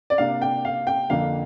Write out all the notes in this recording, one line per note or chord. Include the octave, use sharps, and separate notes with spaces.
D5
C3 A#3 D4 F5
G5
F5
G5
F2 D3 A#3 F5